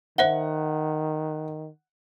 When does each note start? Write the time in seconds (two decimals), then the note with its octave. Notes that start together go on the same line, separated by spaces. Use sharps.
0.18 D#3 C5 E5 F#5 G7